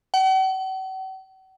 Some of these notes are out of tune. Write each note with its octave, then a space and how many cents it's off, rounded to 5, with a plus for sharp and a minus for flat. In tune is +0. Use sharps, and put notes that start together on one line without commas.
F#5 +45